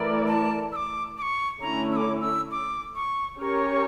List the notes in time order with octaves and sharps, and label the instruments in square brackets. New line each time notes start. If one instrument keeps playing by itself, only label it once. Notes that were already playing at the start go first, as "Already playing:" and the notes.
Already playing: [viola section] E3 A3 E4 A#4 D5
[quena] A5
E6
D6
D6
C#6
[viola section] D3 A3 C#4 E4 [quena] A#5
[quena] E6
D6
E6
D6
C#6
[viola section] C#4 G4 A#4 C#5 [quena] C#6